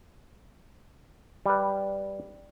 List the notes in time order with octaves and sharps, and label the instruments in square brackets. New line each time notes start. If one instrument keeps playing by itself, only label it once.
[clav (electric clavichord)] G3 B4